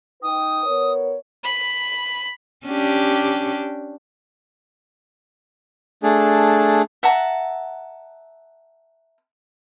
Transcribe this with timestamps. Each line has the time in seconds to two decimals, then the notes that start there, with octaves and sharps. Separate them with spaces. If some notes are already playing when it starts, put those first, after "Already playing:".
0.23 D#4 B4 G5 D#6
0.66 B3 A#4 C#5
1.43 B5
2.66 C#4 D4 G4
6.03 A3 D4 G#4
7.03 E5 F#5 A5 A#5